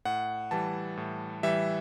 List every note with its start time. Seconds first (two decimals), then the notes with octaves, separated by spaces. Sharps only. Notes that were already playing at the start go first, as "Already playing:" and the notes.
0.05 A2 F#5
0.51 E3 G3 A5
0.97 A2
1.43 E3 G3 E5